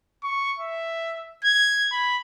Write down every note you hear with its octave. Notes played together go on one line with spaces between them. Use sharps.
C#6
E5
G#6
B5